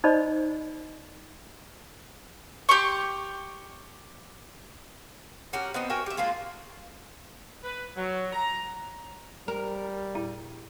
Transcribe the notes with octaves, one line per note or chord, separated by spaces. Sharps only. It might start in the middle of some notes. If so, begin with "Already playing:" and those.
D#4 C5 D5 D#5 B5
G4 C6 C#6
C#4 F#4 G4 A#4
B3 C4 D#4
F#4 A#4 G5 G#5
G4 E5
G#3 A#3 D4 F4
B4
F#3
A#5
G3 A#4
E2 A#2 E4